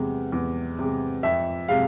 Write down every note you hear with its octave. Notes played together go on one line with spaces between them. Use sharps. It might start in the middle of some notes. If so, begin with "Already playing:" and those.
Already playing: E2 C3 G#3
E2
C3 G#3
F2 E5
C3 G#3 F5